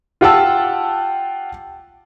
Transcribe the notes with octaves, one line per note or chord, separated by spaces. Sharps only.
F4 G4 F#5 G5 A5 E6